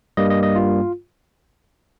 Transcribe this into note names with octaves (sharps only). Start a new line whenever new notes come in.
G2 G3 A#3 D#5
D#5
D#5
F4